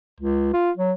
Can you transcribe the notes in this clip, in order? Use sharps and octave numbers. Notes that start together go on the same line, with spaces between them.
C#2
F4
F#3